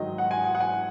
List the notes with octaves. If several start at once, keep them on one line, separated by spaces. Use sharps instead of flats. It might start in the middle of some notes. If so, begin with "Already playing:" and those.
Already playing: G#2 D#3 F#3 D#5
F#5
G#5
F#5
F#5
G#5